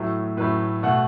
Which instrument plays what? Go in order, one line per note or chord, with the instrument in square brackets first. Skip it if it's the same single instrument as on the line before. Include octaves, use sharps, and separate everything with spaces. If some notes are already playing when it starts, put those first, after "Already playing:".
Already playing: [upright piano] A2 F#3 A3 B4
A2 F#3 A3 B4
B2 A3 F#5